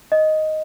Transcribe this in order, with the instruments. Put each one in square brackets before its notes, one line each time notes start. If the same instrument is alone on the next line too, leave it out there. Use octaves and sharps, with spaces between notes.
[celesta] D#5